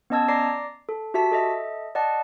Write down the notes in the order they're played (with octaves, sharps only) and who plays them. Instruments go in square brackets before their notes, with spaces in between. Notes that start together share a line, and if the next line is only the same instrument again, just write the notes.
[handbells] B3 C#4 D#5 A5 E6 G#6
D5 A#5 D6 A#6 C7
A4
F#4 G4 E5 A5 B6
A4 D#5 E5
D5 D#5 F#5 A5